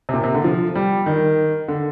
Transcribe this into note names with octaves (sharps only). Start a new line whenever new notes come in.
C3
A#2
C3
D3
F3
G3
D#3
D3